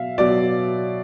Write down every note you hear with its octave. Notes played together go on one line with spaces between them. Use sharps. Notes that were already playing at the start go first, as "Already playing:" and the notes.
Already playing: B2 F#3 E5 F5
B2 F#3 D5